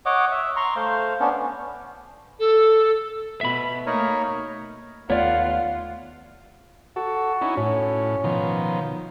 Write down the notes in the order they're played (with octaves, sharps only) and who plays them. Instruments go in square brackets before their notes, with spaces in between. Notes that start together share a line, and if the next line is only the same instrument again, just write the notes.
[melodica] C#5 D#5 F#5 D6
E5
A#5 C6 C#6
A3 C5 F5
B3 C#4 D4
[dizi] A4
[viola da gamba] B2 [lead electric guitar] E5 B5
[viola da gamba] A3 A#3 [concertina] D#4 A#4 C#5
[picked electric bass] D#2 A3 B3 [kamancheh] F4 F#5 [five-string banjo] C#5 D5 [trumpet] F5
[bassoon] F#4 [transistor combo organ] A4
[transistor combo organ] C#4 D#4 E4
[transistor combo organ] A2 [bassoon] C#4
[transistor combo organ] B2 D#3 F3